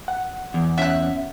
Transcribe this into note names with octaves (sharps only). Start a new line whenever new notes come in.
F#5
E2
C#4 E5 F#5 F#6